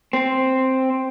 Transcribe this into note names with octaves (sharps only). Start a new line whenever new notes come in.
C4